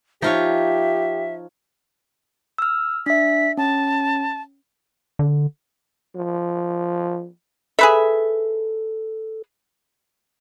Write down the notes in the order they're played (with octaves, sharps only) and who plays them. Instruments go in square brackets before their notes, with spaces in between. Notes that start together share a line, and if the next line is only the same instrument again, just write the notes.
[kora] F3 [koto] D#4 F4 C#5 [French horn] G4 [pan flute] E5
[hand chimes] E6 F6
[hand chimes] D4 E5 [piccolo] B6
[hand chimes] C#4 [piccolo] A5
[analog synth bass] D3
[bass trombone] F3
[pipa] G#4 B4 E5 [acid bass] A4